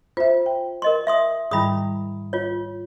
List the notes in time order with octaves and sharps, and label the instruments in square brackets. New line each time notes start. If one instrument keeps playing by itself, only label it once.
[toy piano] F4 [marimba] C5 E5
[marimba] G5
[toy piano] A#4 D#5 C6
E5 C6 D#6
[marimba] G#2 D#3 G3 [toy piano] E4 B5 D#6
[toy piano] F4 C#5